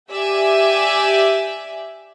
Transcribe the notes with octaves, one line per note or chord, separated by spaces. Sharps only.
G4 D5 E5 G#5